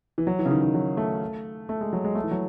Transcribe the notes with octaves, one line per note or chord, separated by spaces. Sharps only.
E3
F#3
E3
C#3
D#3
D#3
F#3
A3
A3
G#3
F#3
G#3
A3
E3
F#3